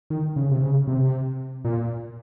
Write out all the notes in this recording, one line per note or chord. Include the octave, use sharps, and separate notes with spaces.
D#3
C#3
C3
C#3
C3
A#2